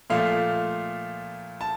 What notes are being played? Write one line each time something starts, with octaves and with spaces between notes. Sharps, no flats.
A#2 F3 A3 F5
A5